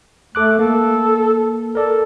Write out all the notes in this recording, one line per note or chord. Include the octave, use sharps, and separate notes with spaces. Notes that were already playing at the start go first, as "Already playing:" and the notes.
A3 A4 D6 F#6
A#3 A4
A4 A#4 D5